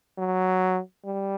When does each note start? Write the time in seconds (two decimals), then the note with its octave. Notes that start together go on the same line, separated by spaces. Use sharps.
0.18 F#3
1.06 G3